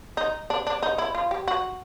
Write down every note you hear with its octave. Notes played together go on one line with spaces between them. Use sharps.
D#4
D4
D4
D#4
E4
F4
G4
F#4